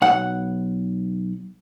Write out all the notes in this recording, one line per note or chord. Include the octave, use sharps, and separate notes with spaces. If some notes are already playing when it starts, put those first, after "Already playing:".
B1 F#5